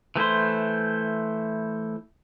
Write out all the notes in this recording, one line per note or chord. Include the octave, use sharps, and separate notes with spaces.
E3 A3 E4 C5